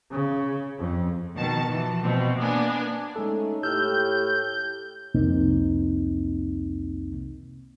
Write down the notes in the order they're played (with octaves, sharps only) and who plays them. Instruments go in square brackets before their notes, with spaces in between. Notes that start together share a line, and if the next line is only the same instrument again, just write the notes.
[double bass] C#3
F2
[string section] B2 D#3 A5
E3 F3
B2 C4
A#3 B3 D4 G#5
[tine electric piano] G#3 A4 [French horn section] A3 C#4 D#4
[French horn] A2 [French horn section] G4 [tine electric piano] E6 F6 [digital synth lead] G6
[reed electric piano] C2 F2 C3 A#3 C4 D#4